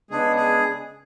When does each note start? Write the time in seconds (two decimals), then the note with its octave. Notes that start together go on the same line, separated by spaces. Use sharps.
0.10 C#3 G#3 B3 D4 G#4
0.37 G#4